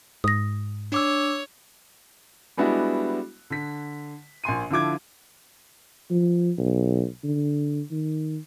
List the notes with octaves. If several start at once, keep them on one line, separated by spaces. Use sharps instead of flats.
G#2 D#6 A#6
D4 C#5 D6 E6
G3 G#3 B3 D4 E4 F#4
D3 B6
A#1 G#5 C6 D#7
D3 F3 E4 D6 G#6
F3
B1
D3
D#3